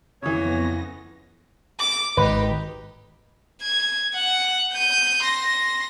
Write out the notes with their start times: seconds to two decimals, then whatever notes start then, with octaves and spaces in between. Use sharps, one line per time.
0.22 F2 C#3 E3 B3 C#5 A#6
1.79 D6
2.17 G#1 D#4 G4 B4
3.62 G#6
4.13 F#5
4.73 G6 D#7
5.23 C6 A#6